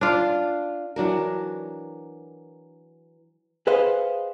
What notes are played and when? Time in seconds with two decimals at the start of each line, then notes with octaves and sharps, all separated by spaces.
0.01 D4 F4
0.96 E3 F#3 D4 A#4
3.67 G#4 B4 C5 D#5 F5 F#5